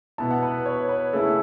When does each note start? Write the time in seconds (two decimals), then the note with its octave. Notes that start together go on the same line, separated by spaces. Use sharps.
0.18 B2 B3 E4 A5
0.31 F#5
0.43 B4
0.66 C#5
0.89 B4
1.13 C#3 A3 E4 A4